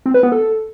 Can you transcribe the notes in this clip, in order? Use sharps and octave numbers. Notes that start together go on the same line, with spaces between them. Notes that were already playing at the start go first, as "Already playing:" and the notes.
C4
B4
B3
A4